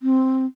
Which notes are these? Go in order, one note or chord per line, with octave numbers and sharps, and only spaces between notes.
C4